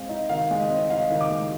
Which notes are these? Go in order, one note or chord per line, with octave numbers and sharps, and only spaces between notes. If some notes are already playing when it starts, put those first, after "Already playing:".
Already playing: G#3 C4 F5
D#4
D#3 F5
G#3
D#5
C4
D#4 F5
D#3
D6
G#3